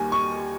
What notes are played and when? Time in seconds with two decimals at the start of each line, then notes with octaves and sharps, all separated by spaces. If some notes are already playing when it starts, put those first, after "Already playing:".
Already playing: D#2 D#3 G3 A#3 G#5
0.12 C#6